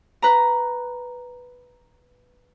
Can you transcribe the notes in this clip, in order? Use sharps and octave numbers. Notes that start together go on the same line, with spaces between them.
B4 A#5